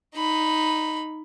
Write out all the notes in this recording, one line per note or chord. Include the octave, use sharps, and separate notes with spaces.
D#4 B5